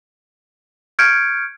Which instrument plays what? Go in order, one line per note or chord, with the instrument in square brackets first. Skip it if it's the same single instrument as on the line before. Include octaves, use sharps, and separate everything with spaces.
[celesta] C#6 F6 G6 G#6 C#7 D7